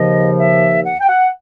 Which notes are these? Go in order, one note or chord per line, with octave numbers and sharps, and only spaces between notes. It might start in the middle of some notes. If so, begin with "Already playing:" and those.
Already playing: D#2 C#3 F3 D#5
E5
F#5
G5
F#5